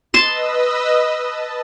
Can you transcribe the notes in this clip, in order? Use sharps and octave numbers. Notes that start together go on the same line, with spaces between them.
B4 D#5 A5 C6 E6
A5